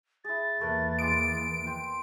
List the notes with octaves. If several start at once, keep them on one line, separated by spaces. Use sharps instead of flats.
E4 G#4 A6
E2 E3 A3 A#3 A#4 B4
G#3 D6 D#6 D7
G5 C6